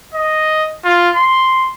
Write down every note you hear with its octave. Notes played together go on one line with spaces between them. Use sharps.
D#5
F4
C6